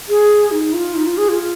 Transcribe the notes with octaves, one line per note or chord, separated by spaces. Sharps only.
G#4
D#4
F4
D#4
F4
G#4
F4